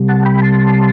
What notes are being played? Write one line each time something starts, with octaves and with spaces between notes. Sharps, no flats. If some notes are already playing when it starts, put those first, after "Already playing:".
Already playing: C3 G3
F#5 A5
G5 B5
A5 C6